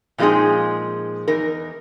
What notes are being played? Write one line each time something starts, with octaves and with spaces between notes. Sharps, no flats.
A#2 F3 G#3 C4 D#4 G#4
E2 D#4 A#4